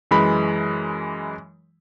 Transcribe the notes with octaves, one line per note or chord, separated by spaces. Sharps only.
F#2 E3 G#3 B5